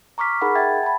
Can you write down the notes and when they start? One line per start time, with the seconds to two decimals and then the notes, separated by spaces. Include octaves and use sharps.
0.18 A#5 C#6 D6 F6 B6
0.41 D#4 G#4 A#4 F#5 B5
0.55 E5 F#5 G5 G#6 A6
0.83 A5 B5